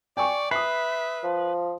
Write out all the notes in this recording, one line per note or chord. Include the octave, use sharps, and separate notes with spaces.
D5 G5 G#5 C#6
B4 E5 D#6 C7
F3